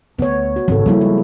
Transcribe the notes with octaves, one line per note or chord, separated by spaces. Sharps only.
D2 B3 C#5
F#4
G#1 C#3 A4
F3 G3 A#3 E4
G#3